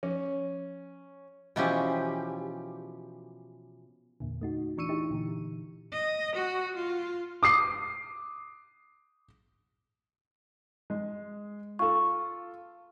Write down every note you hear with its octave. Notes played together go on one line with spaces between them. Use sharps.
F3 C#4
B2 E3 F3 C#4 E4 G4
E2 A#2 D3
A3 D#4 F#4
E3 D4 C#6 E6 C#7 D#7
D#4 E4 G4
A#2 D3 E3
D#5
F#4
F4
D6 D#6 C7
G#3
F4 A4 C#6